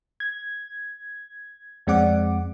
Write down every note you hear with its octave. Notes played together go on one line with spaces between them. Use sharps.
G#6
F2 G#3 C4 D5 F#5 D6